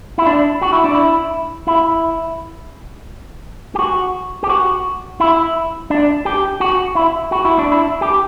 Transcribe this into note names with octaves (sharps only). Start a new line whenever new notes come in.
E4
D4
F#4
E4
D4
E4
E4
G4
F#4
G4
F#4
E4
D4
G4
F#4
E4
F#4
E4
D4
E4
G4